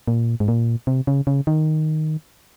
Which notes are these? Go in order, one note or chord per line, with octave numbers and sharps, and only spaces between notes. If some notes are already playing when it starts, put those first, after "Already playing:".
A#2
G#2
A#2
C3
C#3
C#3
D#3